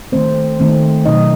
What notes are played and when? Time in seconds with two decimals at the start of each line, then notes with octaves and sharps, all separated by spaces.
0.12 D#3 A3 C4 C5
0.60 D#3 A3 C4
1.05 B2 F#3 A3 C4 D#4 D#5